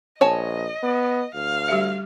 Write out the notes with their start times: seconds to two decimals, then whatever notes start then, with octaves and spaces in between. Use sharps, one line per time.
0.21 A#1 C#5 D#5 G#5 A5
0.83 B3
1.35 D2 F5
1.68 G3 G4 E5